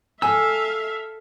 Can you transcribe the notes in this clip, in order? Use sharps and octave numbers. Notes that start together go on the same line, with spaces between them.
A4 E5 F5 G#5 E6